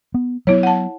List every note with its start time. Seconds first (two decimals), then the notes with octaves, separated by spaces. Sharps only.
0.14 B3
0.47 F#3 B3 E4 C#5
0.63 F#5 A5